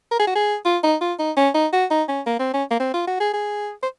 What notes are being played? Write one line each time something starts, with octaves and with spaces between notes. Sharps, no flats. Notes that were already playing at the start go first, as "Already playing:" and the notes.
A#4
G#4
F#4
G#4
F4
D#4
F4
D#4
C#4
D#4
F#4
D#4
C#4
A#3
C4
C#4
A#3
C4
F4
F#4
G#4
G#4
C5